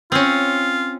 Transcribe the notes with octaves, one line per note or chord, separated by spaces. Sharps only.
C4 C#4 F4